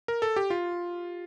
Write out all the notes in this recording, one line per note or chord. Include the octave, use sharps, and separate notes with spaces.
A#4
A4
G4
F4